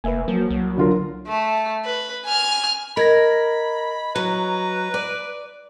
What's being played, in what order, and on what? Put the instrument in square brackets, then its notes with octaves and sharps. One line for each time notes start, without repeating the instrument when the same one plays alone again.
[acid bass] F1 [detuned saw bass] A#3 [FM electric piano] B4 E5 G#5
[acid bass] F3 [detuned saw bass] F#3 [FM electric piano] A#3
[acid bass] C2
[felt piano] D3 F4 A#4
[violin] A3
B4
G#5 F6
[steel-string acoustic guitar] A#4 [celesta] D#5 G#6 A#6 [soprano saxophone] B5
[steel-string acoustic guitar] F#3 [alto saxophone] B4 [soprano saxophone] A#5
[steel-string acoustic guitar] D5